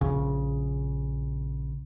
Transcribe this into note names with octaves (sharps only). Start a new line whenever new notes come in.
A#1 C#3